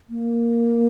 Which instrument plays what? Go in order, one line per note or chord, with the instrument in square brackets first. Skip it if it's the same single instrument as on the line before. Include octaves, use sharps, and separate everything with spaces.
[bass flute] A#3